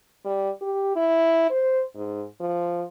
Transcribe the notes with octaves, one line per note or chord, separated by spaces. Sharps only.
G3
G4
E4
C5
G#2
F3